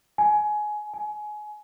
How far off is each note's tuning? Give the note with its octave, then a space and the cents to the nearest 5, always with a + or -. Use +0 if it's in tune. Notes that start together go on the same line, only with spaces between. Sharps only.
G#5 +20
G#5 +25